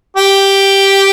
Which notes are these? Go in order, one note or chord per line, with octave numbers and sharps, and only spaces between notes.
G4